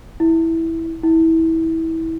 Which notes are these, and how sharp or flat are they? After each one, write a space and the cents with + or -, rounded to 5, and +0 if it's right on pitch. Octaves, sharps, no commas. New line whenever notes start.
E4 -10
E4 -25